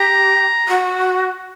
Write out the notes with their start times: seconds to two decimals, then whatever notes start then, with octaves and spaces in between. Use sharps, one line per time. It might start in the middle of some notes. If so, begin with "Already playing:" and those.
Already playing: G4 A#5
0.68 F#4